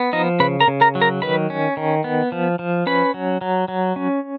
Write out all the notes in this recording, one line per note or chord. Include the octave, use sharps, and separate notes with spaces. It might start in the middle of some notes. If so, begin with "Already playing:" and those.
Already playing: B3
F3 D#4 D#5
C#3 B4 B5
A#4 A#5
C#3
A#4 A#5
F#3
A#4 A#5
D#3 B4 B5
C#4
D#3
B3
F3
F3
C#4 B4 B5
F#3
F#3
F#3
C#4